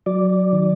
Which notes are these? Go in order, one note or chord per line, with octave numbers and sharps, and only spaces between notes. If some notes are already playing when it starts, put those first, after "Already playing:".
F#3 D5
D#3